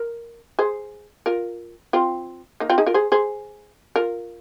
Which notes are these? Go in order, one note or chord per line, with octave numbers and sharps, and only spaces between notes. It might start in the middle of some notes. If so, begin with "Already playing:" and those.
Already playing: A#4
G#4 C5
F4 A#4
C4 F4
A#3 D#4
C4 F4
D#4 G#4
F4 A#4
G#4 C5
G#4 C5
F4 A#4